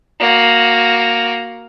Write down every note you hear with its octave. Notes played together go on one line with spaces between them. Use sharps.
A#3 F#4